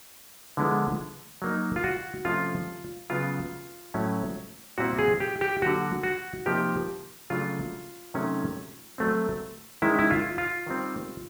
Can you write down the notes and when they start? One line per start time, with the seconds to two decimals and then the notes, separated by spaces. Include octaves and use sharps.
0.57 D3 F3 G#3 B3 E4
1.42 F#3 A#3 D#4
1.76 F4
1.84 F#4
2.25 C3 F3 A3 C#4 F4
3.10 C#3 F#3 B3 F4
3.94 A2 F#3 A3 C#4 E4
4.78 A#2 G3 C4 E4 F#4
4.99 G#4
5.20 G4
5.41 G4
5.62 D3 F#3 A#3 F#4
6.03 F#4
6.46 C3 F3 A#3 D#4 G4
7.30 C#3 F#3 A3 D4 F4
8.14 C3 D#3 F#3 A3 C#4
8.98 F#3 A3 C4
9.82 D#3 G#3 C#4 E4
9.99 E4
10.10 F4
10.38 F4
10.66 D#3 G3 C4